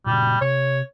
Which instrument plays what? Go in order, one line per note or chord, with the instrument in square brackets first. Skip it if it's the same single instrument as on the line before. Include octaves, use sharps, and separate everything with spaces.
[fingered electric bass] A#2 C#3 [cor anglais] G3
[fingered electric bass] C3 [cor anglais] C#5